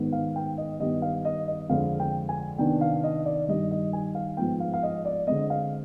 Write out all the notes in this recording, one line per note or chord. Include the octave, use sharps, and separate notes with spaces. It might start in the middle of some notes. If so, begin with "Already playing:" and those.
Already playing: G#2 D#3 B3
F5
G5
D#5
G2 D#3 G3 B3 D#5
F5
D#5
D#5
F2 D3 G#3 F5
G5
G#5
C3 D#3 B3 D4 G5
F5
D#5
D5
G2 D#3 G3 D#5
D#5
G#5
F5
G#2 F3 B3 G5
F5
F5
D#5
D5
D3 G#3 C4 D#5
F5